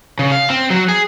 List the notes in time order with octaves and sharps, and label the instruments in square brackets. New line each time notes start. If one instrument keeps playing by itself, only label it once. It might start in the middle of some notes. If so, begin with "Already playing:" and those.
[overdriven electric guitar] C#3
F5
C4
F#3
G#4